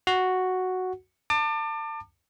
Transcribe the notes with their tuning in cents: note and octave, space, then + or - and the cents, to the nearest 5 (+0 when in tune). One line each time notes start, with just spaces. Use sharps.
F#4 +0 F#5 +0
A5 +30 D6 +30